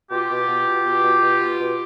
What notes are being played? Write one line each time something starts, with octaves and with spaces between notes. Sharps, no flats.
B2 F4 G4
B2
B2
B2
B2
B2
B2
B2
B2